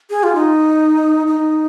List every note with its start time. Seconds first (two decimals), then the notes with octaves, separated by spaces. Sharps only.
0.10 G#4
0.23 F4
0.35 D#4
1.27 D#4